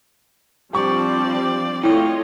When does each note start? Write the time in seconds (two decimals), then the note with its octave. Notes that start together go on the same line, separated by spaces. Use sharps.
0.73 F3 G3 C4 D4 G4 D5 C#6
1.83 A3 E4 F4 C#5 D#5 G5